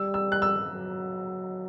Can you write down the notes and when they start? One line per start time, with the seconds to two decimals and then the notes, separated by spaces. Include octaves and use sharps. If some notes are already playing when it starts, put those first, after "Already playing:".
Already playing: G3 E6
0.14 E6
0.32 F#6
0.42 E6
0.69 F#3